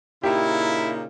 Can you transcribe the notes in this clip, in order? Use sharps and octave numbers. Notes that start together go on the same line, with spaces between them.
A#2 C#3 D#4 E4 G4